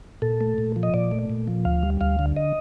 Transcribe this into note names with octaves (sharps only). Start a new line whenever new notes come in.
A#2 A4
A3
A#2
F3
D#5
A#2 D5
A3
A#2
F3
D2 F5
G3
D2 F5
D3
D#5